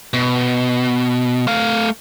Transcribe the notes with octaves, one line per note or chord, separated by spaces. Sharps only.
B2
A3 F5